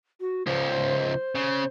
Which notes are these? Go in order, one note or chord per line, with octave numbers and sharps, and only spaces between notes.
F#4
C#2 F3 C5
C#3